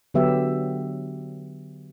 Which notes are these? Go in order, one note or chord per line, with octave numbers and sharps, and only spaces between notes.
D3 F#3 B3 G4 E5